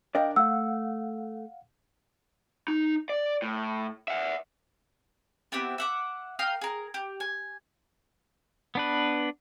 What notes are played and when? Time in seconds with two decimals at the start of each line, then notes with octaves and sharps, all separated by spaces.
0.15 D4 A#4 D5 D#5 F5 G5
0.36 A3 F5 F#5 E6
2.68 D#4
3.09 D5
3.42 A2
4.08 E5 F#5
5.52 B3 C4 E4 G4
5.78 E5 F#5 D6
6.39 A#4 F5 G5 D#6
6.61 G#4 A#4
6.94 G4
7.20 G#5
8.75 B3 D4 B4